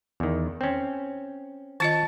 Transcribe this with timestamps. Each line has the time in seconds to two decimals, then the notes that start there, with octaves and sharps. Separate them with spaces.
0.20 E2 D#3
0.61 C4 C#4
1.80 D#3 F4 D#5 A5